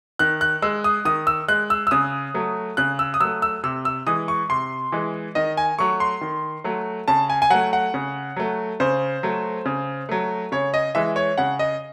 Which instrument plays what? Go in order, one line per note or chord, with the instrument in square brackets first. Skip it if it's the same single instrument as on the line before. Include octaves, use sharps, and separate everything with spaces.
[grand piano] D#3 F#6
F#6
G#3 E6
D#6
D#3 D#6
E6
G#3 F#6
E6
E6
C#3 D#6
F#3 A3
C#3 F#6
E6
D#6
F#3 A3 E6
E6
C3 E6
E6
E3 G#3 D#6
C#6
C3 C6
E3 G#3
D#3 D#5
G#5
F#3 A3 C#6
C6
D#3
F#3 A3
C#3 A5
G#5
G#5
F#3 A3 F#5
F#5
C#3
F#3 A3
C#3 C5
F#3 A3
C#3
F#3 A3
C#3 C#5
D#5
E3 G#3 E5
C#5
C#3 F#5
D#5